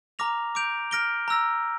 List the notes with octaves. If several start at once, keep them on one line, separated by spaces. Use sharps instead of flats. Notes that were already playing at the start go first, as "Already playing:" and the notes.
A#5 D6 F6 A#6 F7
D6 G6 D7 F7
F6 A#6 D7 G7
A#5 E6 A#6